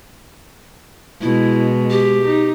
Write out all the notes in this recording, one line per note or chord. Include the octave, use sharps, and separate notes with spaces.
B2 G#3 E4
G4
D#4